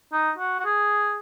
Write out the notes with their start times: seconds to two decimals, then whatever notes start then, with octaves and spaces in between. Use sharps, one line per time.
0.12 D#4
0.38 F#4
0.59 F#4
0.65 G#4